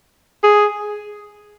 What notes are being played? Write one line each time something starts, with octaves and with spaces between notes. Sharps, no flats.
G#4